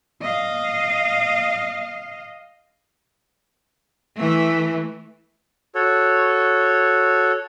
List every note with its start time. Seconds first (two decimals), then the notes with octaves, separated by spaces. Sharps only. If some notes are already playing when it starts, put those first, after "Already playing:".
0.21 D#5 F5
4.16 E3 A3
5.75 F#4 A4 C#5